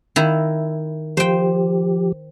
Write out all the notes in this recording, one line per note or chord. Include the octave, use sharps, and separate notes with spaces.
D#3 E4
F3 G4 C5 G5